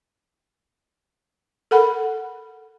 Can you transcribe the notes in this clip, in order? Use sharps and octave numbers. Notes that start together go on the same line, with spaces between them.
A4 A#4 F#5 B5